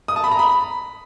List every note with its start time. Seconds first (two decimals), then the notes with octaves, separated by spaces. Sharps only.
0.08 D#6
0.16 A5
0.24 B5
0.31 A#5
0.39 B5